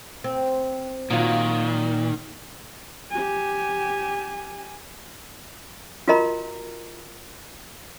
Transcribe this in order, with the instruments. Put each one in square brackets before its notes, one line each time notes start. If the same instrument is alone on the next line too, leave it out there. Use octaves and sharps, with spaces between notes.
[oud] C4
[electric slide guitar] A#2 [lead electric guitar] D#3 [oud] F#3 F4
[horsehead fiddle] G4 G#5
[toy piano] F4 F#4 A#4 D#5 A#5 B5